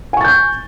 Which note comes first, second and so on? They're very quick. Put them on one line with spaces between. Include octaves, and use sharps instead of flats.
G#5 C#6 A6 G6